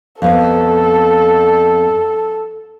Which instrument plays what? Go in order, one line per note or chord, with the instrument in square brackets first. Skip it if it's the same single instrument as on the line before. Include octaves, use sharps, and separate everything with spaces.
[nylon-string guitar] F2 B3 [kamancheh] A4